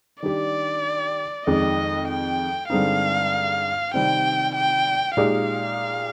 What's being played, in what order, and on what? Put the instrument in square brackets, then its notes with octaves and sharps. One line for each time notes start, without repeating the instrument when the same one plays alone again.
[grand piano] D#3 G3 D4 G4 [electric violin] D5
[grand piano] F2 D#3 G#3 [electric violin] D#5
[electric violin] G5
[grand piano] G2 D3 G#3 C4 D#4 [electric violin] F5
[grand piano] C3 D#3 G3 C4 [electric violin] G5
[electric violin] G5
[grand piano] A#2 G#3 D#4 G4 [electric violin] F5